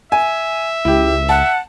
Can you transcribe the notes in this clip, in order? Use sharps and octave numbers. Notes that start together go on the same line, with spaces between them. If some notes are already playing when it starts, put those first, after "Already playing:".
E5 G#5
C#2 E4 G4
F#5 A5